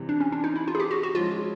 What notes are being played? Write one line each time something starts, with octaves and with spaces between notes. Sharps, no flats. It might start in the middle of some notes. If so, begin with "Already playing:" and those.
Already playing: C3 E3 G3
D4
C#4
D4
D#4
E4
F4
G#4
G4
F#4
F#4
F3 G#3 C#4 E4 F4